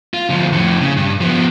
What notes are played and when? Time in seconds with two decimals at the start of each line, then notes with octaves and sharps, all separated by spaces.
0.14 F4
0.30 D2 F3
0.53 F2 A2
0.81 C#3
0.97 G2
1.21 F3 B3